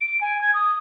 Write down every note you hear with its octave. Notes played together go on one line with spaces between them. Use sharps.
D7
G#5
G#6
D#6